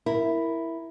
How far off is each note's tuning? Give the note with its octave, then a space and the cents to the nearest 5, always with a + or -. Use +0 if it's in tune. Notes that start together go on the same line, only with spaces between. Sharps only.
E4 +0 A#4 +0